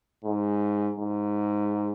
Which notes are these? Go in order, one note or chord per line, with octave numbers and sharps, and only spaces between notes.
G#2
G#2